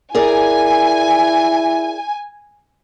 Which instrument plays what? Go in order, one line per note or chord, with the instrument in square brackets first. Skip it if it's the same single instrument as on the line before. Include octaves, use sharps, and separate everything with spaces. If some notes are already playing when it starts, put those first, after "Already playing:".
[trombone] E4 [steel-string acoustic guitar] G#4 A#4 D5 [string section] G#5